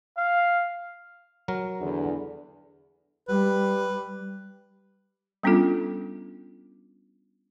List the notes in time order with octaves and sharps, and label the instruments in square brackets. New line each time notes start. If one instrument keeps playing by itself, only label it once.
[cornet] F5
[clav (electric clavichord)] F#3 A#4
[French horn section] E2 D3
[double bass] G3 [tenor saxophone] B4
[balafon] G3 B3 C#4 D4 F4 A4